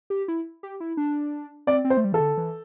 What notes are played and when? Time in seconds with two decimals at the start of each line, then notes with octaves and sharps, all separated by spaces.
0.10 G4
0.28 E4
0.63 G4
0.80 E4
0.97 D4
1.67 C4 D5
1.85 C4
1.90 C5
1.97 A3
2.04 G3
2.12 E3 A4
2.20 D3
2.37 E3